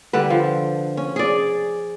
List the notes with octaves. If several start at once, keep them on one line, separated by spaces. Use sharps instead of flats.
D3 G3 B4
F3
C#4
G#4 D5